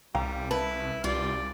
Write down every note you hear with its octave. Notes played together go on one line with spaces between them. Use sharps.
C2 G3 F5 G5 A#5
E4 B4 A5
C2 G3 F4 D5